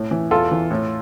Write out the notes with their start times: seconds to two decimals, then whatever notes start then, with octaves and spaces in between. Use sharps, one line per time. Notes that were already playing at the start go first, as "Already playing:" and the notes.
Already playing: A2
0.11 E3
0.31 E2 F4 A4
0.51 E3
0.71 A2